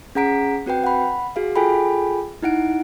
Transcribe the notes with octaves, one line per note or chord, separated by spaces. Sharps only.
C#4 G#4 F#5 A#5 B6 D7
C4 F#4 B4 G5
F#5 B5
F#4 G#4 F5
F4 G#4 A4 G5 G#5 B5
D#4 E4 F#5 D7